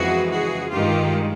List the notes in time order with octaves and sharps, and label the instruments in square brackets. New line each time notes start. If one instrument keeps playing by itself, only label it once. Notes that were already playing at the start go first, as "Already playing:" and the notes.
Already playing: [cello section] F2 C#3 E3 G#3 F#4 G#4
F#4 G#4
G2 D#3 G#3 F4 G4